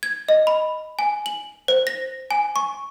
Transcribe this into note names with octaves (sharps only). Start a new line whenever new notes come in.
G#6
D#5
B5
G#5
F#7
C5
A#6
G#5
C#6